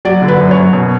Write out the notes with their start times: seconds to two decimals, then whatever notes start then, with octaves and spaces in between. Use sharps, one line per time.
0.05 F#3 D5
0.22 D3
0.28 B4
0.40 F#2
0.51 C#5
0.56 F#2
0.73 B2